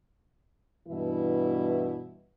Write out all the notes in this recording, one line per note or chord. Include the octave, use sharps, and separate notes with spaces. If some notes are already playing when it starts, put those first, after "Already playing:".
G2 B2 E3 E4